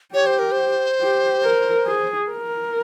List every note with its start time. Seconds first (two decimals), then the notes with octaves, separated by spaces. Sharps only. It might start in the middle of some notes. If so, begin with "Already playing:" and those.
0.14 G4 C#5
0.26 C5
0.39 A#4
0.52 C5
1.01 G4
1.44 A#4
1.87 G#4
2.31 A#4